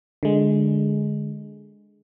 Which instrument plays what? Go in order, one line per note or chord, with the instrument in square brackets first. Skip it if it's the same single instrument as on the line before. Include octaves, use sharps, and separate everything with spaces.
[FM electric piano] D3 G#3